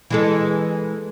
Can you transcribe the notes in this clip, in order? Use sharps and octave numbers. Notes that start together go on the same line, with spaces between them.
E3 G#3 A4